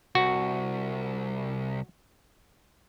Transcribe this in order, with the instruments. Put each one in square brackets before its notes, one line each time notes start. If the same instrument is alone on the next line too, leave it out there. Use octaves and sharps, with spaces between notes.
[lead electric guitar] C2 [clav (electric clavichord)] F#4